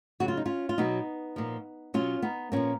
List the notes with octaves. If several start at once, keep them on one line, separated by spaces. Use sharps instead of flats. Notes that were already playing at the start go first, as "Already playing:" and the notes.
C#3 F#3 F#4
F4
D#4
C#4 F4
F4
B2 F#3 B3 D#4
A#2 F3
B2 F#3 C#4 F4
B3 D#4
A#2 F3 A#3 C#4